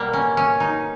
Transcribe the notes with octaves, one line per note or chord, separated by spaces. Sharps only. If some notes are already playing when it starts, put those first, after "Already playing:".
Already playing: B2 G3 A#3
C#4
C#4
D#4